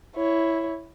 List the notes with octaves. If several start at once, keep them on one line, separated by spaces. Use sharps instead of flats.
E4 C#5